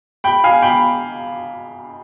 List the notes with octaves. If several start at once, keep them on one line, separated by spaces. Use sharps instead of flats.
G5 B5
F5 G#5
G5 B5